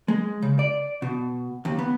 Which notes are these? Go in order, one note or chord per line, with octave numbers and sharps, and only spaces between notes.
G#3
C#3
D5
B2
D#2
B3